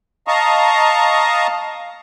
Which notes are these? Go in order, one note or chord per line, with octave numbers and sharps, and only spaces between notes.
D#5 F5 A5 A#5 C#6 D#6